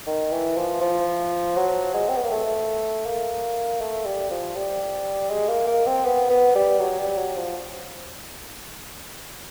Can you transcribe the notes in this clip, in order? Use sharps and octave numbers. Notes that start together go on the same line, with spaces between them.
D#3
E3
F3
F3
F#3
G#3
C4
B3
A#3
A3
A#3
A3
G3
F3
G3
G#3
A#3
A#3
C4
B3
B3
G3
F#3
G3
F#3
F3